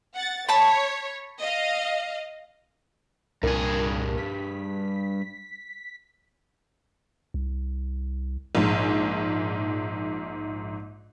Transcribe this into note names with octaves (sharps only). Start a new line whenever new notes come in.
F#5 A6
C#5 A5 B5
D#5 F5
C2 G2 A#2 G#4 A#4
B6
C2
A#1 G#2